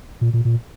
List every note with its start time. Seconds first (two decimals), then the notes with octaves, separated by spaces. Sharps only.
0.21 A#2
0.33 A#2
0.45 A#2